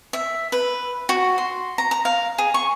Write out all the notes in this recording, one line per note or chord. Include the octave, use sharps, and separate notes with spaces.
E5
B4
F#4
C6
A#5
A#5
F5
G#4
C#6